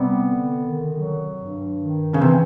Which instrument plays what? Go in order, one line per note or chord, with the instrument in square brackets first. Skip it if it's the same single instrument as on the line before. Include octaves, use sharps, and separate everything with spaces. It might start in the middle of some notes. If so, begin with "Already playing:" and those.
Already playing: [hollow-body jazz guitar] C3 [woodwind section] G3 B3
[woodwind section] D3
D#3
F#3
G2
D#3
[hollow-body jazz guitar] C#3 [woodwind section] E3
[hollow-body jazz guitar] C3